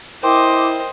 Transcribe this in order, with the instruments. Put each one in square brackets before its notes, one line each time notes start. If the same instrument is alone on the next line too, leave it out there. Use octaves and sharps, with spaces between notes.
[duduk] E4 [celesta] A#4 G5 C6 [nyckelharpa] C5 D#5 [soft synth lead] D6